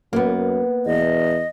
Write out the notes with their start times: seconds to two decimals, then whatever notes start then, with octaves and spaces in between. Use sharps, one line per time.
0.13 F#2 A#3 B3
0.86 E2 D#5